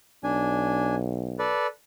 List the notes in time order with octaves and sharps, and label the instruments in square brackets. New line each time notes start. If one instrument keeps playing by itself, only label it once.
[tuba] B1 [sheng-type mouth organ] D4 G#5
[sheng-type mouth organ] A4 B4 D5